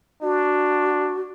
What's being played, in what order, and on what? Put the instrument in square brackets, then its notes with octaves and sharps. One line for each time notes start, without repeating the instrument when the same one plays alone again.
[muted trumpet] D4 [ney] F#4